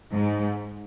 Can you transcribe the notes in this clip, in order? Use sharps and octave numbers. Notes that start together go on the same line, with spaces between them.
G#2